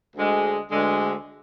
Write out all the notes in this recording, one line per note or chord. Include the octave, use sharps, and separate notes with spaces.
D2 D3 G#3
D2 D3 G#3